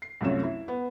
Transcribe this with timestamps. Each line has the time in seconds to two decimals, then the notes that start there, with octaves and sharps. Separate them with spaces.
0.02 C7
0.21 C2 F#2 A3 F4 C#5 E7
0.43 E4
0.68 B3